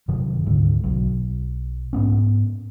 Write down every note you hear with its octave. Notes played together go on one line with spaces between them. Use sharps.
F#2 C3 D#3 F#3
D2 G#2 D3
B1 F#3
G#2 B3 C#4